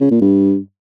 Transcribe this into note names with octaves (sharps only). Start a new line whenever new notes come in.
C#3
A#2
G2